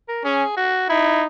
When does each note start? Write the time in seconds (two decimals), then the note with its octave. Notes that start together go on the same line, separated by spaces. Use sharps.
0.08 A#4
0.24 C#4 G#4
0.57 F#4
0.89 D#4 E4